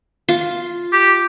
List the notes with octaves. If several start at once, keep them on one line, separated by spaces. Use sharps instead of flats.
F4
G4